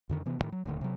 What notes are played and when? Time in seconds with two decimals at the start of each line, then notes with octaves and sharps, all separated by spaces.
0.09 F2 D3 D#3
0.26 C3 E3 B3
0.39 D2 A2 D#3
0.52 F#3
0.65 D#1 D2 D3
0.81 C3 F#3